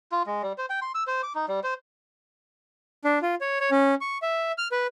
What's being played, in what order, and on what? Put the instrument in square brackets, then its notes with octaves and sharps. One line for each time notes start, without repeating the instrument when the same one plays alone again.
[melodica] F4
G#3
G3
C5
G5
C6
E6
C5
D6
D#4
G3
C5
[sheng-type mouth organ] D4
F4
C#5
C#5
C#4
C#6
E5
F6
B4